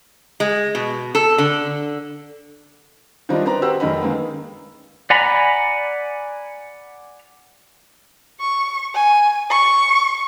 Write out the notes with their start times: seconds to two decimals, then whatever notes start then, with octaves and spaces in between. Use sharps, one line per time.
0.40 G#3
0.75 B2
1.15 A4
1.38 D3
3.29 D#3 G3 C4 D4 D#4 F4
3.45 C4 B4 D5 A#5
3.62 F#4 G4 C5 F#5 E6
3.80 F1 D#3 A#4 D#5 B5
4.01 D#3 G#3 A#3 B3
5.10 D5 F#5 G#5 A#5 B5
8.41 C#6
8.95 G#5
9.51 C#6